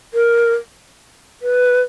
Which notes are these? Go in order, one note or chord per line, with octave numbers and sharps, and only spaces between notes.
A#4
B4